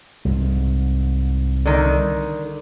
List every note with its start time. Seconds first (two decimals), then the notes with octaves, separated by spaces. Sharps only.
0.25 C2 G#2
1.65 D3 D#3